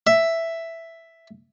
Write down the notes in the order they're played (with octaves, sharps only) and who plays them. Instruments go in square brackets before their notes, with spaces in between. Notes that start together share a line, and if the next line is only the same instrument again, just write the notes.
[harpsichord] E5